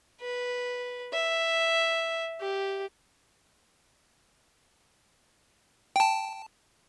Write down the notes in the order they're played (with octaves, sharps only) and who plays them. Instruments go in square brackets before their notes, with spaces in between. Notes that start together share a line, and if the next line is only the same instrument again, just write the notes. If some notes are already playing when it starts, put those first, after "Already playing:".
[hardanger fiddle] B4
E5
G4
[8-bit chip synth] G5 A5